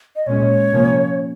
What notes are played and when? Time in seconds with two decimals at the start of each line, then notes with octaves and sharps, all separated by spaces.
0.16 D#5
0.27 A#2 G#3 C#4 C#5
0.71 C3 F3 A#3 C#4